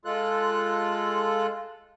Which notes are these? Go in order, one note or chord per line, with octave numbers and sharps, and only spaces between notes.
G#3 F4 A4 F#6